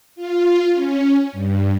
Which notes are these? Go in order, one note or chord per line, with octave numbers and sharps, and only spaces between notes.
F4
C#4
G2